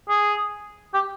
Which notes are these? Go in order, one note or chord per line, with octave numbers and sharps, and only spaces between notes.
G#4
G4